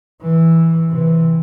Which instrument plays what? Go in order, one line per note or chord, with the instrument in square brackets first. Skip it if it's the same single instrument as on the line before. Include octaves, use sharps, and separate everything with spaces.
[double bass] E3
C3 E3